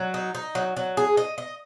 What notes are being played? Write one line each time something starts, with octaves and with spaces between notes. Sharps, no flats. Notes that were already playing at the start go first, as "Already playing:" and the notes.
Already playing: F#3
D#4
D#4
F#3
F#3
G#4
D#5
D#5